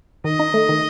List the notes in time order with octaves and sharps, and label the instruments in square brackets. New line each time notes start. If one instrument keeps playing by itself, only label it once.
[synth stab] D#3 [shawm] D#5
[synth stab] D#4
A3
D#3